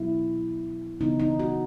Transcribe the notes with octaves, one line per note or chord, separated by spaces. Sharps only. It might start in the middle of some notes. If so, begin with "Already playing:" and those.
Already playing: B2 F#3 B3 E4
C#3 E3 B3 D#4
D#4
F#4